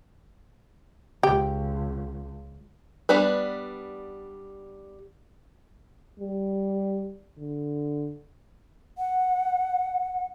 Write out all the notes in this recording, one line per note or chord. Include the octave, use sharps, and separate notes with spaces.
C#2 G4
G3 B3 D4 B4
G3
D3
F#5